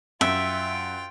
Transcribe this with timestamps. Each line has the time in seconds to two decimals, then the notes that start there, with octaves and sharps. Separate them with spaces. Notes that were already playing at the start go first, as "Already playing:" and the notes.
0.21 F#2 F4 E5 G5